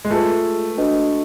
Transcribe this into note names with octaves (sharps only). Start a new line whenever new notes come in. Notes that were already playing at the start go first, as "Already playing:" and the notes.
G#3
A3 F4 G#4 B4
D4 F#4 B4 D#5